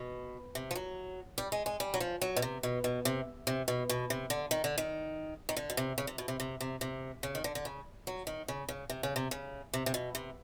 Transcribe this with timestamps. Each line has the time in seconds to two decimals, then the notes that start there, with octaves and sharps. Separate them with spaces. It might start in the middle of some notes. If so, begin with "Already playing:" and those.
Already playing: B2
0.55 C3
0.71 F3
0.76 F#3
1.38 G3
1.52 G#3
1.66 G#3
1.80 G3
1.94 F#3
2.00 F3
2.22 F#3
2.36 B2
2.42 C3
2.63 B2
2.84 B2
3.05 C3
3.47 C3
3.68 B2
3.89 B2
4.10 C3
4.30 D3
4.51 D#3
4.64 D3
4.78 D#3
5.49 D#3
5.57 D3
5.70 B2
5.77 C3
5.98 C#3
6.07 C3
6.18 B2
6.28 C3
6.40 C3
6.61 C3
6.81 C3
7.23 C#3
7.35 D#3
7.44 D3
7.55 D3
7.65 C#3
8.07 F#3
8.27 D#3
8.48 C#3
8.69 C#3
8.90 C3
9.03 C#3
9.16 C3
9.31 C#3
9.74 C3
9.86 C3
9.94 B2
10.15 C3